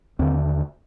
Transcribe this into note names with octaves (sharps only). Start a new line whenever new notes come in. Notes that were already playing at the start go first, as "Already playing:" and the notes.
D#2 D3 C4